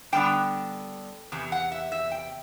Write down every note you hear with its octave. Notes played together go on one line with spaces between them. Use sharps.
D3 G3 B3 D4 G5
E2 C3
F#5
E5
E5
G5